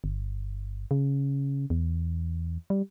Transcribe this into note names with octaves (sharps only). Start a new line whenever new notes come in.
G1
C#3
E2
G3